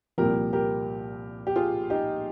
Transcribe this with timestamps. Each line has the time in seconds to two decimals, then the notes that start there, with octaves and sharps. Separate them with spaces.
0.18 C2 A#2 F3 G4 A#4
0.53 G4 A#4
1.47 G4
1.56 F4 G#4
1.90 D#4 G4